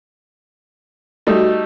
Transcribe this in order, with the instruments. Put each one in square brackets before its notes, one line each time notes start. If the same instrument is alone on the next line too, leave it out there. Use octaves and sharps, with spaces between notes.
[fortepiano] G3 A3 D#4 [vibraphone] F#4